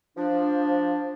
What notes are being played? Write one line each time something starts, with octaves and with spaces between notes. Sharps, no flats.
F3 D4